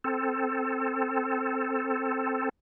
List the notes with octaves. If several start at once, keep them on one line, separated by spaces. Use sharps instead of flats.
C4 A4